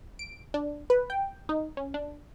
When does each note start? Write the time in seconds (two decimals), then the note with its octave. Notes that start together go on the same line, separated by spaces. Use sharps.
0.19 D7
0.54 D4
0.90 B4
1.10 G5
1.49 D#4
1.77 C#4
1.94 D4